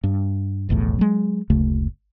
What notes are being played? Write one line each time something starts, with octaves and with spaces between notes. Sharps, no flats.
G2
F1 B1 E2 A2
F#3 G#3
F#1 D2 C#3 A3